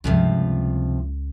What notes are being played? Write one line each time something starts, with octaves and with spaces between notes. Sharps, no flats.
C#2 G2 C3 F3 F4